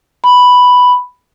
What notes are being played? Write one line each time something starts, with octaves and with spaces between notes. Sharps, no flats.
B5